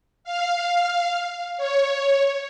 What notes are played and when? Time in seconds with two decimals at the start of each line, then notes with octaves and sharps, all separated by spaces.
0.24 F5
1.57 C#5